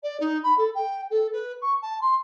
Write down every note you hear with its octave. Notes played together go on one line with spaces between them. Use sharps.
D5
D#4
B5
A4
G5
A4
B4
C#6
A5
C6